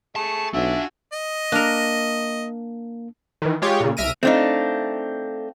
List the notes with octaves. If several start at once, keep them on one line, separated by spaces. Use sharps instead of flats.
A3 G#4 A5 C#6
B1 D4 F4 F#4 E5 G#5
D#5
A#3 D4 A#4
D#3 E3
G#3 F4 G4 C#5
A#2 C#3
C2 E5 F6 A#6 D7 D#7
A3 C4 D4 D#4 F4